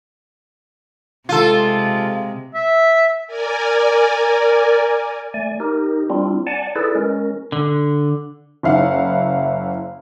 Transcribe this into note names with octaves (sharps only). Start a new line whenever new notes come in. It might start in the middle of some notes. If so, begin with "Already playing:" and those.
C3 G#3 F4 A4
E5
A#4 D5 G#5
A3 D5 G#5
D#4 G4 A#4
G3 C4 D4 E4 F4
D5 F#5 G#5 A5
E4 G#4 A4 B4 D5
G#3 C#4 A#4
D3
F#1 E4 F5 F#5